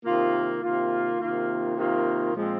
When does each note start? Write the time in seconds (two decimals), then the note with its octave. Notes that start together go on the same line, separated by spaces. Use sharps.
0.05 C3 D#3 A#3 F4
0.62 C3 D#3 A#3 F4
1.19 C3 D#3 A#3 F4
1.76 C3 D#3 A#3 F4
2.34 A#2 F3 G#3 C4